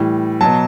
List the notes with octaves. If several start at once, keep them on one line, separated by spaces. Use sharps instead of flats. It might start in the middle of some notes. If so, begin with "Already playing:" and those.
Already playing: A2 E3 G3
B2 F#3 A5